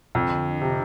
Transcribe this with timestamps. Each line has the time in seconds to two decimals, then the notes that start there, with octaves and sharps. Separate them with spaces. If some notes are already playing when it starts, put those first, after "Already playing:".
0.15 F2 D3
0.61 C3